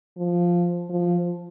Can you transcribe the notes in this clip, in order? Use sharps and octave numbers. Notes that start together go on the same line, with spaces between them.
F3
F3